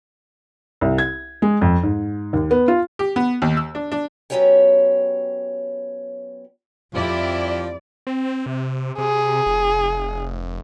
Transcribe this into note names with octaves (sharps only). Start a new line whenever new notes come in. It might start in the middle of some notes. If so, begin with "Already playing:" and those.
C2
G#6
G#3
F2
G#2
D#2
B3
F4
G4
B3
D#2
E6
D4
D4
F#3 B3 C#4 G4 C#5 G5
F2 F3 E4 G4 D5
C4
C3
C3 G#4
F1